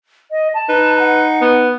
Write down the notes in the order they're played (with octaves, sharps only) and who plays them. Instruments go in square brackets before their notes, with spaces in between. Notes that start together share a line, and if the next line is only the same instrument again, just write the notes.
[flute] D#5
A5
[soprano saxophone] D#4 [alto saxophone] B4
[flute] F#5
[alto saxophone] B3